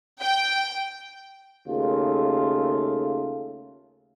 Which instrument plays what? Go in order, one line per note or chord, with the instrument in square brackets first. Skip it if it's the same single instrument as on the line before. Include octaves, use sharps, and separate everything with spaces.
[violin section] G5
[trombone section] D#2 C#3 A3 F4